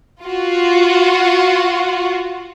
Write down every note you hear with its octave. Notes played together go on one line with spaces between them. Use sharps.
F4 F#4